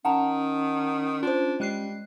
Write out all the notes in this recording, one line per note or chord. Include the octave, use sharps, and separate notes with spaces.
D#3 C#4 F#5 A5 A#5
D4 F4 C5
G3 G#3 F#6 C7